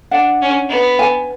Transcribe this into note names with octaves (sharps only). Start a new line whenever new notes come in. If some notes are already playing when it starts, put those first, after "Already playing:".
D4 F#5
C#4
B3
G#5